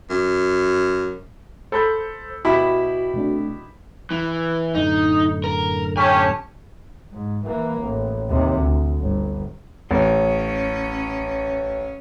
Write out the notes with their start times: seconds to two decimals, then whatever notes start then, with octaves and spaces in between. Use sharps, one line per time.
0.10 F#2
1.72 A4 C5 B5 G6
2.45 B2 E4 F#4 G4 B5
3.14 C3 A3 D4
4.11 E3
4.75 F#2 A2 D3 D#4
5.44 A#4
5.97 C#4 G4 G#5 A5
7.11 G#2
7.45 E3 A#3
7.80 A1
8.29 D#2 C3
8.60 D2
9.00 G1
9.91 A1 C#4